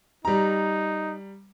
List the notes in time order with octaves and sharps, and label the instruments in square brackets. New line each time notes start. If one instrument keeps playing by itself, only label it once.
[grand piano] G3 A#5 [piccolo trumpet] D#4